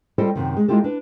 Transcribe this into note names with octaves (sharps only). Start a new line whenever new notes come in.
G3 F4 A4 C5 D#5 G5
F#2 C3 D#3
G#3
G#3 A#3 E4 F4 G4 A4
D4 B4